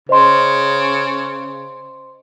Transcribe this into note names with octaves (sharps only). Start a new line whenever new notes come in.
C#3 C5 D#5 C6